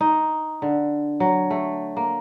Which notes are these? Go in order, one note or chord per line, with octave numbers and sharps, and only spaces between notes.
D#4
D3
F#3
A3
A#3